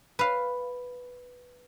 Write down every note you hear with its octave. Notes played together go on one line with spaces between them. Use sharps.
B4 F5